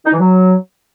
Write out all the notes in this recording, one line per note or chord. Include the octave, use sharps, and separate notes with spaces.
D#4
E3
F#3